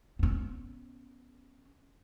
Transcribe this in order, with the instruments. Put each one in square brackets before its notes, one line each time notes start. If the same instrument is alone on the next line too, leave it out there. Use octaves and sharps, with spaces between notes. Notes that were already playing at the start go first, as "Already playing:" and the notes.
[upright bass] B3 C#4